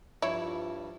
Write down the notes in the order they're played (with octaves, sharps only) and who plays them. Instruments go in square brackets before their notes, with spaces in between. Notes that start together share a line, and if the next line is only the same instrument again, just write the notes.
[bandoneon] G2 [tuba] F3 [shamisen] E4 [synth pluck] C#5